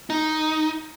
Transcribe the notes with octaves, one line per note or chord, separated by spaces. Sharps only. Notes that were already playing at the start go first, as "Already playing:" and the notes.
D#4